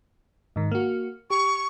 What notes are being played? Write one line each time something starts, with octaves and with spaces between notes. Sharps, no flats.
G#2 D#3
A#3 F#4
G4 C#6